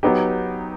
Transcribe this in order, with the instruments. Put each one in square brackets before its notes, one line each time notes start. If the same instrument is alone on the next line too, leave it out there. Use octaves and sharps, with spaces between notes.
[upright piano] F#3 B3 D#4 G4